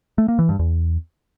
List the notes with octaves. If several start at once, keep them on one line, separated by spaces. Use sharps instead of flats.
A3
A#3
E3
G2
E2